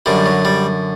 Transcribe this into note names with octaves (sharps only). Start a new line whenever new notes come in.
F#2 D3 G3
F#3
G3